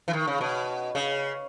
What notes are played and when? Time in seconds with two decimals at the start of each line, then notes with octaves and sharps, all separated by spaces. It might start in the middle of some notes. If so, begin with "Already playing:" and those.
0.08 E3
0.13 D#3
0.27 C#3
0.41 B2
0.95 C#3